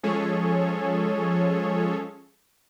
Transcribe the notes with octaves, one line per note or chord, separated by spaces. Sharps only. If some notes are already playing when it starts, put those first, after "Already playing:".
F3 G#3 C#4 G#4 A4 C#5